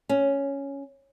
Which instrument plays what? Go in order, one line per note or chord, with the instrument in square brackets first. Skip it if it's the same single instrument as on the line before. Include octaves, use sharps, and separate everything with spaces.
[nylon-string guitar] C#4